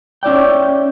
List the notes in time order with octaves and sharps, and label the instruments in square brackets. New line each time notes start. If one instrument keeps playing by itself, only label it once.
[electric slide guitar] C#4 E4 D5 G5